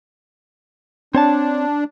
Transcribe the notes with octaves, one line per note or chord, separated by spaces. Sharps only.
C4 D4 C#5 A5